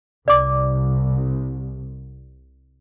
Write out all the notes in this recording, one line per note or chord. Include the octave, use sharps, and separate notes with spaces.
C2 D5 D6